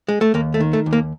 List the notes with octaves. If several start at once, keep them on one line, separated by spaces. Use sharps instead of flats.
G#3
A3
D#2 A#3
A3
D#3
A3
D#2
A#3